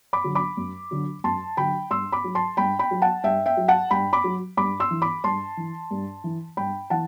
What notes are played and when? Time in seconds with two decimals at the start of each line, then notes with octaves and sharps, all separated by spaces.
0.13 B5 D6
0.24 D3 F#3
0.35 B5 D6
0.57 F#2
0.91 D3 F#3
1.24 F#2 A5 C6
1.57 D3 F#3 G5 B5
1.90 G2 C6 E6
2.12 B5 D6
2.24 F#3
2.35 A5 C6
2.57 G2 G5 B5
2.79 G5 B5
2.91 F#3
3.02 F#5 A5
3.24 G2 E5 G5
3.46 E5 G5
3.57 F#3
3.68 F#5 A5
3.91 G2 G5 B5
4.13 B5 D6
4.24 F#3
4.57 G2 B5 D6
4.80 C6 E6
4.91 E3
5.02 B5 D6
5.24 G2 A5 C6
5.57 E3
5.91 G2
6.24 E3
6.57 G2 G5 B5
6.90 E3 F#5 A5